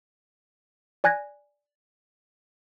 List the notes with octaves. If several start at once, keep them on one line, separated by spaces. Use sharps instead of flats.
D5 G#5 F#6 G#6 A#6